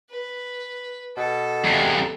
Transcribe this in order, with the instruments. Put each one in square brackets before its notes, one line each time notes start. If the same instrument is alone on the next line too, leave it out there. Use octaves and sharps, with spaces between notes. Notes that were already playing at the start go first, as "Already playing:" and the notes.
[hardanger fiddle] B4
[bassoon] B2 [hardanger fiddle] A4
[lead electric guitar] E2 C3